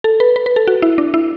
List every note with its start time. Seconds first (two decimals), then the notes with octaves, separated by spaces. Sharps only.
0.04 A4
0.20 B4
0.36 B4
0.46 B4
0.56 A4
0.67 F#4
0.82 E4
0.98 D4
1.14 E4